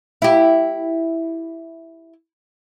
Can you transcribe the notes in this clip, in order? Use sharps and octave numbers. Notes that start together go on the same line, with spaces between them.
E4 G4